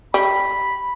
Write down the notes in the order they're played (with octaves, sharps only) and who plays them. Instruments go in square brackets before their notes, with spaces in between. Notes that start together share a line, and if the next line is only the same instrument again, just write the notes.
[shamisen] G3 [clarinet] B5